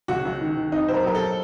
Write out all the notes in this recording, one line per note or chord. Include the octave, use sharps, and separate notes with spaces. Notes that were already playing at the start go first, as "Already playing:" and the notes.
C#2 F#4
C#2
D#3
D#3
F2 D#4
F#3 C5
A#4
F#3 A#4
A4